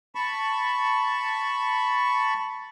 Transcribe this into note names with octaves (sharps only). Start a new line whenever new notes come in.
A5 B5 C#6